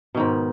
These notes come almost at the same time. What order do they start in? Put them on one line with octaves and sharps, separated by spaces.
B2 D#3 G#2